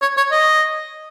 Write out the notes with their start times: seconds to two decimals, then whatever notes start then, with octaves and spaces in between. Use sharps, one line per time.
0.02 C#5
0.17 C#5
0.31 D#5